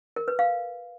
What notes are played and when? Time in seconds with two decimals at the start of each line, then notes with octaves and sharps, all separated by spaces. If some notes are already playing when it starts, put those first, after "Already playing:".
0.16 A#4
0.28 B4
0.39 F5